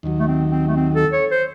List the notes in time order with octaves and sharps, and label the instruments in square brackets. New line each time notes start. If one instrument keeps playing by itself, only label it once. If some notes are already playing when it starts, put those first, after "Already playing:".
[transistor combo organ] D#2 D#3 F#3
[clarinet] A3
C4
C4
A3
C4
A4
C#5
C5